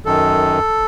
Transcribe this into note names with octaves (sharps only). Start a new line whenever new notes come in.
F#2 D#3 A4